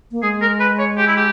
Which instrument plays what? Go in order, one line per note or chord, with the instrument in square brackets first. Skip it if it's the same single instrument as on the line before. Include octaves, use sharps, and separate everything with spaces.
[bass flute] A#3
[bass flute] G#3 [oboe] G#4
[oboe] A#4
B4
C#5
G4
E4
G4